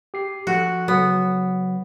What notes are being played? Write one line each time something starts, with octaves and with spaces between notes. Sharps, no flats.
G4 C7
F3 F#4 A4 F#6
C#3 F#3 B3